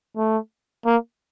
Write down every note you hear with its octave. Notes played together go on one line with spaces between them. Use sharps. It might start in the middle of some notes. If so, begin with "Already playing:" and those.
A3
A#3